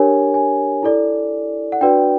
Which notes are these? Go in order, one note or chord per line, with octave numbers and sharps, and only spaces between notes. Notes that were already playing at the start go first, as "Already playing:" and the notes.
Already playing: D4 G4 A#4 C#5 G#5
G#5
E4 A4 D5
F#5
D4 F#4 B4 D5 G5